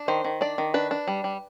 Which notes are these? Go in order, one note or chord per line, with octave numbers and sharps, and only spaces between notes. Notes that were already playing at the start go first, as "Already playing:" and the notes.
Already playing: D4
D#3 C5
D#3
D4 D5
D#3
D4 B4
D4
G3
G3